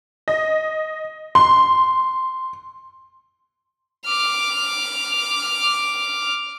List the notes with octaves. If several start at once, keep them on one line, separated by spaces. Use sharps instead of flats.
D#5
C6
D6 F6